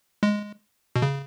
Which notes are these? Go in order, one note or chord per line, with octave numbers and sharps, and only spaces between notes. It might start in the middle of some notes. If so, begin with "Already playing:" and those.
G#3
B2
C#3